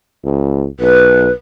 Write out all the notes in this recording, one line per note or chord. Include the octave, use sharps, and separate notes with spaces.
C#2
B1 B4